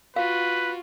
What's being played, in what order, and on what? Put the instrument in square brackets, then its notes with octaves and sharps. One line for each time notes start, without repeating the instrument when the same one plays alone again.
[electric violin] F4 F#4 [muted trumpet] B4 [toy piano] F5